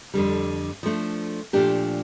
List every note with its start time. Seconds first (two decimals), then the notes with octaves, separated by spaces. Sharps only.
0.14 F2 D3 G3
0.83 F3 A3 D4
1.53 A#2 F3 A3 D4 G4